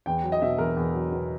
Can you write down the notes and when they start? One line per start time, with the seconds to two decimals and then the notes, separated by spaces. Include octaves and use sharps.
0.06 E2 G5
0.23 F#3
0.32 D#5
0.42 B2 E5
0.58 E2 A#4
0.77 E2
0.94 F#3
1.12 B2